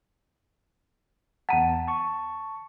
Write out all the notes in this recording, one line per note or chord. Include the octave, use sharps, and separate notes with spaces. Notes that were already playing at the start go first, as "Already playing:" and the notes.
E2 F#5 A5 A#5
A5 C#6